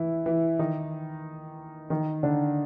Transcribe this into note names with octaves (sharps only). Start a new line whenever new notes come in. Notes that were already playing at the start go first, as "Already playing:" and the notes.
Already playing: E3 E4
E3 E4
D#3 D#4
D#3 D#4
D3 D4